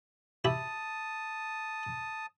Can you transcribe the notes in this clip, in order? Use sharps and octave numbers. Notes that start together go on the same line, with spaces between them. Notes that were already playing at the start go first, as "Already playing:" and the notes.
E4 G4 A5 B5 D#6